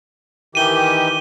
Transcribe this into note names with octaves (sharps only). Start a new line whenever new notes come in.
D#3 E3 G4 D#7 G7